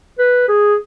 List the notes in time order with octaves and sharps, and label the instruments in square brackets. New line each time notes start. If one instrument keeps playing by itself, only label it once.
[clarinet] B4
G#4